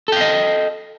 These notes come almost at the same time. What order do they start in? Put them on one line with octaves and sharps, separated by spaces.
A4 G5 F5 D#5